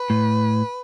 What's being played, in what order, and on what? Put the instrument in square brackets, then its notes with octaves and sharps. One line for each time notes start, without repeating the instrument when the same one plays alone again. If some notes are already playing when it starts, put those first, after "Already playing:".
Already playing: [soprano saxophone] B4
[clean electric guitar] A2